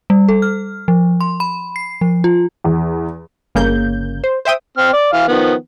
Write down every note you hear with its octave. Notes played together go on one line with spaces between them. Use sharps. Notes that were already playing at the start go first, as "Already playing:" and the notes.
G3
A4
F6
F3
C6
B5
C7
F3
F4
E2
G1 C#3 A#3 G6
C5
C5 E5 G5 D#6
C4 F6
D5
E3 F5
D#3 F3 B3